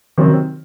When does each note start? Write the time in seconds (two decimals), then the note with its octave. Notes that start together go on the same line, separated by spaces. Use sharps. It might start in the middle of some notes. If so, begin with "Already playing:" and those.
0.17 C3 D#3 F#3 C4